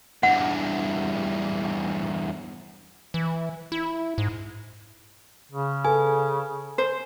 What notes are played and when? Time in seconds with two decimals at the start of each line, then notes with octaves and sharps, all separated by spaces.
0.23 E2 G2 F#5
3.14 E3
3.72 E4
4.18 G#2
5.52 C#3
5.85 A4 B4 G#5
6.78 C5